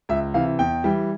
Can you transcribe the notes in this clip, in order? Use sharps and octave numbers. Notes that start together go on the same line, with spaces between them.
C#2 E5
C3 E3 F5
E2 G5
E3 G3